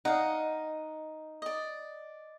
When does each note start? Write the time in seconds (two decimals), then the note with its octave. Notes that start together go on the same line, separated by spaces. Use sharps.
0.05 D#4 F5 F#5
1.42 D5 D#5